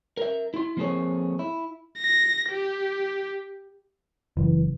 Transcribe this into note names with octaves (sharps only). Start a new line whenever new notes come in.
A#4 E5
E4 C6
F3 A#3 C4 G#4 A4 C#5
E4
A#6
G4
F#1 E3